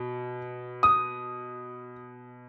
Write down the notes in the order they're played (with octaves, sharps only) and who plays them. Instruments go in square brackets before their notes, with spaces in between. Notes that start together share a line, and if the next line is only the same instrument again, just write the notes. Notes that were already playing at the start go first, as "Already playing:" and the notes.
Already playing: [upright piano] B2
[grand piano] D#6